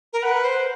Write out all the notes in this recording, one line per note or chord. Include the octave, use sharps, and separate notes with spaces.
A#4
B4 F#5
C5